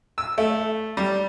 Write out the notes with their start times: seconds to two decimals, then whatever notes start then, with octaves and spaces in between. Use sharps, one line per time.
0.18 E6
0.38 A3
0.97 G3